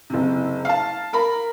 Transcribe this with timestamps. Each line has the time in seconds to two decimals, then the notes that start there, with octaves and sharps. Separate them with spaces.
0.10 F#1 C3
0.65 F5 A5
1.13 A#4 A#5 B5